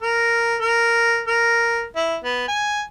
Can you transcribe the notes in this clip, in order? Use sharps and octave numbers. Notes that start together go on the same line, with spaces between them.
A#4
A#4
A#4
E4
B3
G#5